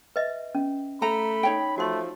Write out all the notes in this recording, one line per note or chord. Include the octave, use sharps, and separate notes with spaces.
B4 D#5 E5
C#4
A3 A#5 B5
D#4 C#5 G5
F3 A3 F#4 C6